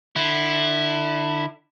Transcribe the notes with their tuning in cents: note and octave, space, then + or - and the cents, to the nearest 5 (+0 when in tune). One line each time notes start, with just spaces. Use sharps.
D3 +30 E4 +0